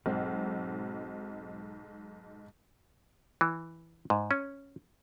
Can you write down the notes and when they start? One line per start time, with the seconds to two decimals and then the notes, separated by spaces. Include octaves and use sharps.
0.06 B1 G#2 F#3 C4
3.41 E3
4.10 G#2
4.31 C#4